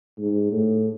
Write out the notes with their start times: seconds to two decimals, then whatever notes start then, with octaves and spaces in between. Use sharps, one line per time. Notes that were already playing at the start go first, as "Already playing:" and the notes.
0.18 G#2
0.52 A2